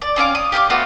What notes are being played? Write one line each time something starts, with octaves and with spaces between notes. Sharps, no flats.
D5
C4 C#4 F5 D6
D#6
G4 F5 G5 D6
A3 B3 F4 F#4